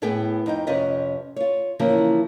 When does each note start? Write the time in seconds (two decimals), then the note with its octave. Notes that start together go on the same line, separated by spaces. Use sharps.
0.02 A2 B3 G#4 B4 G5
0.46 F2 D#4 G5
0.67 F2 C3 C#4 F4 B4 D#5
1.36 F4 C#5
1.79 C#3 E3 F3 A#3 C#4